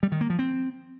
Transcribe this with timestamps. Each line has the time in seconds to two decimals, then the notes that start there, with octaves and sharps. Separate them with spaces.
0.03 G3
0.12 D#3
0.21 A#3
0.30 F3
0.39 C4